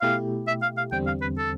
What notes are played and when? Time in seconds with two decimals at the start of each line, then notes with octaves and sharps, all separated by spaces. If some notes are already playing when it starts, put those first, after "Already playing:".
0.02 B2 A3 E4 G4 F5
0.48 E5
0.62 F5
0.78 F5
0.92 E2 D3 G3 C4 G5
1.07 F5
1.22 B4
1.38 A4